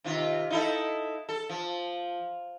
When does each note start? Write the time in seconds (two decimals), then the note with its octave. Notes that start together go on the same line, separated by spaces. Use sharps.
0.04 C3 D#3 F4
0.50 D#4 E4 A4
1.29 A4
1.49 F3